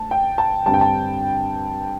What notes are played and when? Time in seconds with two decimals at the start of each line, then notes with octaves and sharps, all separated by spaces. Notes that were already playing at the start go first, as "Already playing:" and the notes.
Already playing: D2 A5
0.11 G5
0.38 A5
0.66 G2 D3 G3 C4 A5
0.74 G5
0.81 A5